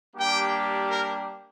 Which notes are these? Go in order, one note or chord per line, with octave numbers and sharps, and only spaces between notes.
G3 A#3 D4 G4 G5
A#4